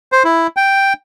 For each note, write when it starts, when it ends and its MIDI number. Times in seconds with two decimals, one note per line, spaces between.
0.12 0.23 72
0.24 0.47 64
0.57 0.93 79